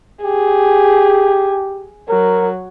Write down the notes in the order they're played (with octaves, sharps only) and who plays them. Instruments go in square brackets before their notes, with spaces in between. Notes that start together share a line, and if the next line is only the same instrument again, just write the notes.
[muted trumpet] G4 [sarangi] G#4
[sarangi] F#3 [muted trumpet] A#4